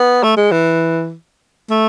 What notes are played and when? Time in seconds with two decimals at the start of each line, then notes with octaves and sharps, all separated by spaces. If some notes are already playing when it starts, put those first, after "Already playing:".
Already playing: B3
0.23 A3
0.37 G#3
0.51 E3
1.70 A3